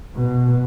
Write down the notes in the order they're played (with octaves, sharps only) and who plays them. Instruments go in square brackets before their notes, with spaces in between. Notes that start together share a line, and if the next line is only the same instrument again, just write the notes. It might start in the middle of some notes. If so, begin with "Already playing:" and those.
[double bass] B2